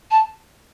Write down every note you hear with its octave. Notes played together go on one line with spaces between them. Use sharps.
A5